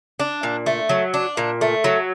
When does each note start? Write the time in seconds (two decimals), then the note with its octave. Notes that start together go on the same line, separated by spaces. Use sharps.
0.19 D4
0.43 A#2
0.66 A3
0.89 F#3
1.14 D4
1.37 A#2
1.61 A3
1.84 F#3